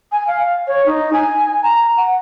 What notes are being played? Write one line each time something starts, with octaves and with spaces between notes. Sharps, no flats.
G#5
F5
C#5
D#4
G#5
A#5
F#5